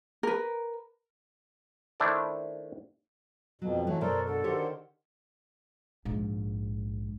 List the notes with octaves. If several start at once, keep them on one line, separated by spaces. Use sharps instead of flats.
A#4 B4
D#3 A3 D4 E4 C5 D5
F2 B2 F#3
E3 F#3 A3
F#2 B2 A4 A#4 C5 D5
D3 A4
D3 D#3 F#4 G4 C5 C#5
A#1 G#2